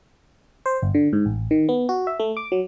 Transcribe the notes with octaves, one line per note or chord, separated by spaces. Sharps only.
C5
G1
D3
G#2
A1
D#3
B3
F#4
E5
A3
D6
F#3